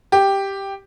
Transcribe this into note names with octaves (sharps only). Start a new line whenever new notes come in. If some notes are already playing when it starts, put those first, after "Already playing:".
G4